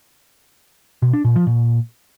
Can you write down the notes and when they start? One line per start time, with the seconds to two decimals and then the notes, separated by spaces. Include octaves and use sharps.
1.02 B2
1.13 D4
1.25 A#2
1.36 F3
1.47 A#2